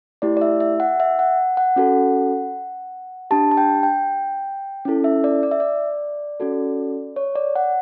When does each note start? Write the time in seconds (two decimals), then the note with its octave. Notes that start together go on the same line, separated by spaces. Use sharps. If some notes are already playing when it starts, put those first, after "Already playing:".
0.22 A3 E4 G4 D5
0.37 D5
0.41 E5
0.60 E5
0.80 F#5
1.00 E5
1.19 F#5
1.57 F#5
1.76 C#4 F#4 A4
3.31 D4 G4 A5
3.51 A5
3.57 G5
3.83 G5
4.85 C#4 E4 A4
5.04 E5
5.24 D5
5.43 D5
5.51 E5
5.60 D5
6.40 C#4 F#4 A4
7.16 C#5
7.36 D5
7.56 F#5